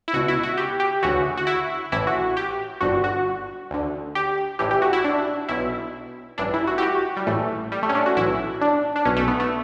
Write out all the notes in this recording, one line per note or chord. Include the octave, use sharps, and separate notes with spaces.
E4
C#2 B2 F#4
E4
F#4
G4
G4
D2 C#3 E3 F#4
F#4
E4
A1 A2 E3 E4
F#4
G4
G1 G2 D3 F#4
F#4
D2 D3
G4
A1 A2 E3 G4
G4
F#4
E4
D4
B1 B2 E4
A1 G2 E3 D4
E4
F#4
G4
F#4
G3
A1 A2 E3 A3
G3
A3
C#4
D4
F#4
B1 A2 E3 E4
D4
D4
B1 B2 C#4
A3
B3
A3